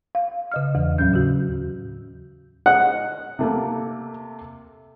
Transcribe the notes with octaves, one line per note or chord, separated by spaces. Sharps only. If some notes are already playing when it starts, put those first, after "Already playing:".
F5
C#3 D#5 F6
E2 E3
D#2 A2 F#3 C#4 G6
C#3 F#4
D#5 F#5
C3 A3 A#3